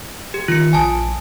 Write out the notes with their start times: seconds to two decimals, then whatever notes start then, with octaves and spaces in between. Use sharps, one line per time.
0.34 G4
0.48 D#3 F4 C#7
0.73 A#1 G#5 A5 D#6